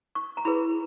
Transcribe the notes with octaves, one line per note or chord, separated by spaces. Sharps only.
C#6
A#5
E4 G#4 B4 B5